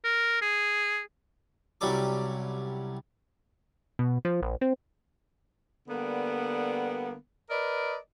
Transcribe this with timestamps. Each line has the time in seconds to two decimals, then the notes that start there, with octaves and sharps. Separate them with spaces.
0.04 A#4
0.41 G#4
1.81 C2 F#3 G3 C#4 A4 D6
3.99 B2
4.25 F3
4.42 A#1
4.61 C4
5.88 D3 G3 A#3 B3
7.50 A#4 B4 D5 D#5